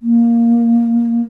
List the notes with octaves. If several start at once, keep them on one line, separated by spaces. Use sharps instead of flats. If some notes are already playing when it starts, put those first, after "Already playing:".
A#3